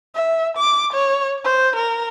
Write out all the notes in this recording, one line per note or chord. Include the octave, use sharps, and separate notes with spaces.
E5
D6
C#5
C5
A#4